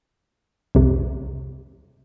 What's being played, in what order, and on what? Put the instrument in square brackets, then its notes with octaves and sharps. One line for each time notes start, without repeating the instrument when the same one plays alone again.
[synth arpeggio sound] C2 F2 C3